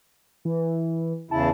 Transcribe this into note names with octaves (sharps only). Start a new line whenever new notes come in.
E3
E2 C#3 E4 A5